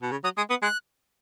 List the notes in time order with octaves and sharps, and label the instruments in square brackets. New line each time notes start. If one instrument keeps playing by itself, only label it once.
[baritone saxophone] B2
C#3
[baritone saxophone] F#3 [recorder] D#6
[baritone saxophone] G#3 [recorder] D#6
[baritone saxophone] B3 [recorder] D#6
[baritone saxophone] G#3 [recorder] F#6